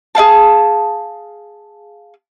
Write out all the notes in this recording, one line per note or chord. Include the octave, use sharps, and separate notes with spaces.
G#4 D5 F5 A5